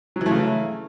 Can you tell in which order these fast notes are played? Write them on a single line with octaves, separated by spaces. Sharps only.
F#3 E3 A3 C#3